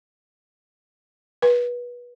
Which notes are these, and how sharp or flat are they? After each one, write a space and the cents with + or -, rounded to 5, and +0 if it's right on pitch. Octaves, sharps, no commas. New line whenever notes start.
B4 -25